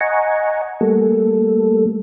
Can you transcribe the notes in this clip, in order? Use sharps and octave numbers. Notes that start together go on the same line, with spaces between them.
D#5 F#5 G#5 A#5 C#6
G3 A3 A#3 A4